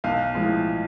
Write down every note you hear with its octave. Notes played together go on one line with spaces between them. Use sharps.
B1 F5
A2 F3 G#3